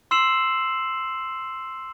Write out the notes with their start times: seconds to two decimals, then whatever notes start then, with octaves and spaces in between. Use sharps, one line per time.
0.11 C6 E6 C7 E7 F#7